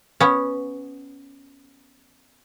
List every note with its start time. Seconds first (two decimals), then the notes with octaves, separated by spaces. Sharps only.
0.20 B3 C#4